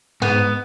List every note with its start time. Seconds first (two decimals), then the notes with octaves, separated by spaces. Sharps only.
0.22 G#2 B3